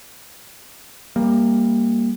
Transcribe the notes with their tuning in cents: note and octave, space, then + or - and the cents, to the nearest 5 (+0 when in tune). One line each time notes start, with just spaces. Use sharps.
G3 +25 A#3 +0